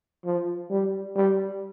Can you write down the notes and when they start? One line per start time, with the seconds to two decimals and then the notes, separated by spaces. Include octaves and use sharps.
0.25 F3
0.70 G3
1.16 G3